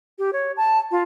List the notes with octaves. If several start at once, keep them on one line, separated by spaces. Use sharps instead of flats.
G4
C#5
A5
F4